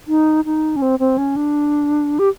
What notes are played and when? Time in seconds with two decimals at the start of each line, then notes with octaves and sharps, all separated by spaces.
0.08 D#4
0.45 D#4
0.76 C#4
0.82 C4
0.99 C4
1.18 C#4
1.36 D4
2.19 G4